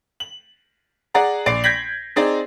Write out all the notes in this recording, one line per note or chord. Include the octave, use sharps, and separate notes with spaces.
F#7
G#4 D5 F#5 A#5
A#1 D5 C7 D7
G6 G#6 A#6 B6 F#7
C4 D#4 G#4 D5